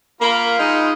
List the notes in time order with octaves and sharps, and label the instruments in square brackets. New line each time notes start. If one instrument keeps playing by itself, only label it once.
[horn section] A#3 [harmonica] F4 B5
[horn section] G#3 D#4